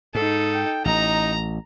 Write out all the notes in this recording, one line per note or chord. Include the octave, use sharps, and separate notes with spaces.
G#2 D#4 A4
G5
A1 D#4 A#5